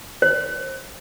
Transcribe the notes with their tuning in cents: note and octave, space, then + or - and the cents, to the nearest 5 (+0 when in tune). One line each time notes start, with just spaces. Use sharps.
C5 +35